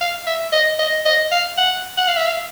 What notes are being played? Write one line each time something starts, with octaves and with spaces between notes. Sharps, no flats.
F5
E5
D#5
D#5
D#5
F5
F#5
F#5
F5
E5
F5